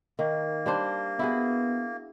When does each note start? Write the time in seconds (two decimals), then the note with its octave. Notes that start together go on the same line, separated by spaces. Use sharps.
0.19 D#3 A#3
0.66 G3 D4 C5
1.19 B3 E4 F#4 G#4